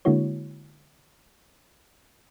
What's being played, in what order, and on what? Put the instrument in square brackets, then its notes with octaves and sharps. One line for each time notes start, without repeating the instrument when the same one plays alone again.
[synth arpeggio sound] D3 G#3 A#3 E4 F#4 C#5